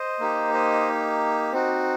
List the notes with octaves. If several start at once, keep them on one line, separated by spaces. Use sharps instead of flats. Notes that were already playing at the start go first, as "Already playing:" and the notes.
Already playing: C5 D#5
A#3 D#4 G4
C5 D#5
C4 D#4 F#4